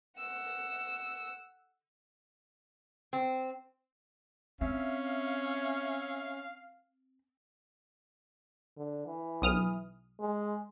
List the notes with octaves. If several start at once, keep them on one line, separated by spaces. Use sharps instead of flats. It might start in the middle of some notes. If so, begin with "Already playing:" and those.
F#5 E6
C4
C4 C#4 E5 F5
D3
E3
B1 D#6 F6
G#3